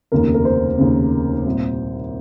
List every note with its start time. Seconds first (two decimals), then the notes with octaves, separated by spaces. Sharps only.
0.12 F1 D#2 C#3 A#4
0.34 A#4
0.45 C5
0.78 F1 D#2 C#3
1.46 C2 A#2